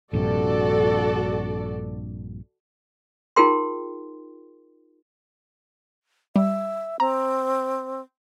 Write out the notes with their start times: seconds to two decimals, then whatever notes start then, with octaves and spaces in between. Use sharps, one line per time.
0.13 A#1 G2 C3 F#4 A4 D5
3.36 D#4 F4 G#4 A#4 G5 C6
6.36 G3 E5
7.00 C4 A#5